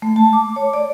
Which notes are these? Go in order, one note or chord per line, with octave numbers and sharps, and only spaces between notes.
A3
A5
D6
C#5
D5